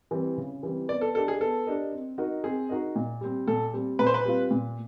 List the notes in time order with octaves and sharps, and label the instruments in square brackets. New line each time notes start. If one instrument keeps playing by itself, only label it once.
[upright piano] E3 G3 C4
C#3
E3 G3 C4
[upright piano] B3 [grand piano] D5
[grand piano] A4
[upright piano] D4 G4 A#4 D#5 [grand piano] A4
[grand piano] G#4
[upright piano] B3 [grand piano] A4
[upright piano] D4 G4 A#4 D#5
C4
D#4 F#4 A#4 D#5
[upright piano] C4 [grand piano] G#4
[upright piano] D#4 F#4 A#4 D#5
A#2
G3 C4
[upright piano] A#2 [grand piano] A4
[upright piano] G3 C4
[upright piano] A#2 [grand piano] B4
[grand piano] C5
B4
[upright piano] G3 C4 F4
A#2